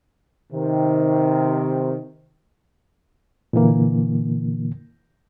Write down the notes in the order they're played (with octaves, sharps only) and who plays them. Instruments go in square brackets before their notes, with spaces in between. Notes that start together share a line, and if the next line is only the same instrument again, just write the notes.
[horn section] C3 D#3
[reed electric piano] A#2 D3 E3 A#3